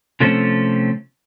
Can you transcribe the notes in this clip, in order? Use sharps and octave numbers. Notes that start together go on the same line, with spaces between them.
C3 F3 A3 C4 C#4